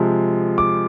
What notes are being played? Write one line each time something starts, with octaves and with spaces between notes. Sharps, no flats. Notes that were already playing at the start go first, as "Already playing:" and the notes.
Already playing: C3 F3 G#3
D6